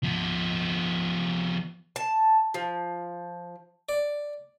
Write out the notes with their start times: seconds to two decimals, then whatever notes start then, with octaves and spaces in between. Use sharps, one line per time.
0.03 F3 B3
1.96 A5
2.54 F3
3.89 D5